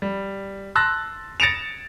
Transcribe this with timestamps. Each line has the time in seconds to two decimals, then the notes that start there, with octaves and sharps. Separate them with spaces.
0.02 G3
0.75 A5 C6 E6 F#6 A6 A#6
1.40 A6 A#6 C#7 D7 E7 F7